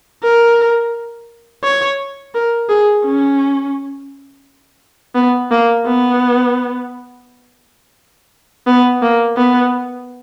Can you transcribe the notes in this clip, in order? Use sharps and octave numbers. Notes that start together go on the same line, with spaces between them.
A#4
C#5
A#4
G#4
C#4
B3
A#3
B3
B3
A#3
B3